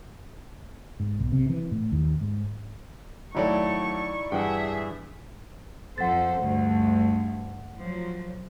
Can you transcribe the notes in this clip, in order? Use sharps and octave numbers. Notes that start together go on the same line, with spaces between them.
G#2
B1
C3
E3
A2
D#2
G#2
D#2 F#3 A3 D#4 E4 D5 C#6
G2 E3 D4 G#4 E5 F#5 G5
F2 A4 C5 F#5 A6
D2 G2
F3 F#3